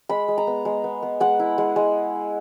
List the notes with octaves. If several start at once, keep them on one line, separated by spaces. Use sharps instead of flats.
G#3 B5
G#3
A#5
B3
G#3
B3
B3
G#3 F#5
E4
G#3
G#3